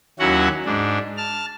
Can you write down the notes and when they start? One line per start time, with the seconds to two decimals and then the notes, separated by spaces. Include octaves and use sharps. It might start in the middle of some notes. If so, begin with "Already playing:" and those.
0.19 D#2 F#3 C#4 E4 F#4 F#5
0.66 G#2 D4
1.17 A5 F6